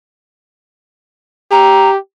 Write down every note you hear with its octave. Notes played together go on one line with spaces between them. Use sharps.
G4 A#5